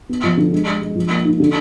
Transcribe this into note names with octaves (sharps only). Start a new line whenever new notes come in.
B3
F3
D3
G#3
G#3
G#3
F3
A#3
D#4
D3